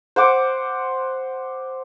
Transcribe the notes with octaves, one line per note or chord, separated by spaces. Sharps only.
C5 F#5 D6